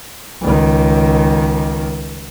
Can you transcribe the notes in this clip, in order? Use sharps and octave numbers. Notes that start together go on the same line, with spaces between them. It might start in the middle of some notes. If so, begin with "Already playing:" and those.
C#2 D#3